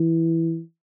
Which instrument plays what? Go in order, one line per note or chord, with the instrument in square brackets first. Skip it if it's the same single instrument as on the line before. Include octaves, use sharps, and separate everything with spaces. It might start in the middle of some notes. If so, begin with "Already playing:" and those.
Already playing: [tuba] E3